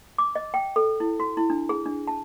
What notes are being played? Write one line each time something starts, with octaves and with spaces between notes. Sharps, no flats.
D6
D#5
G5
A4
E4
F#4
E4
D4
G#4
D4
A5